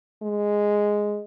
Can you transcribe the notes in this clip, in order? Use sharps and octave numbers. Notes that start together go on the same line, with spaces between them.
G#3